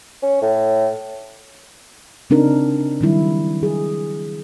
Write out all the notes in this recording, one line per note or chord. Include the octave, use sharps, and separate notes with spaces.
C#4
A2
C#3 C4 D4 D#4 A#4
D#3 F#3 G3 E4
F#3 G#4